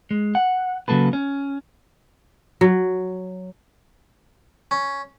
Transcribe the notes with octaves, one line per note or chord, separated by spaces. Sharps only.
G#3
F#5
C#3 F#3 A#3 A4 B4
C#4
F#3
C#4